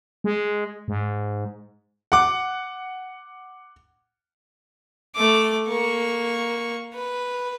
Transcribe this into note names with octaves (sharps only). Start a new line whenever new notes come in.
G#3
G#2
F#5 D6
A3 D6
A#3 C#6
B4